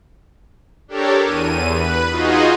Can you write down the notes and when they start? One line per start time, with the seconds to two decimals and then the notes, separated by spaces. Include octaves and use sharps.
0.88 D4 G4 A4 A#4 C#5
1.24 E2 D#7
1.71 B4
2.10 D#4 F4 F#4 G#4 D#5